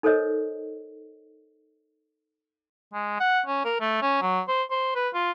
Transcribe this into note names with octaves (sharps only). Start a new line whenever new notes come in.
D#4 A4 A#4 C5 C#5 D#5
G#3
F#5
C#4
A#4
A3
C#4
F#3
C5
C5
B4
F4